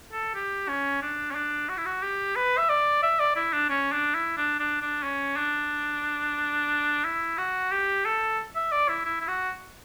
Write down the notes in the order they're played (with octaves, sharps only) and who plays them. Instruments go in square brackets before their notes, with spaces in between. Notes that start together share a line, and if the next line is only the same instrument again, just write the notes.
[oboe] A4
G4
C#4
D4
C#4
D4
F#4
E4
F#4
G4
B4
E5
D5
E5
D5
E4
D4
C#4
D4
E4
D4
D4
D4
C#4
D4
E4
F#4
G4
A4
E5
D5
E4
E4
E4
F#4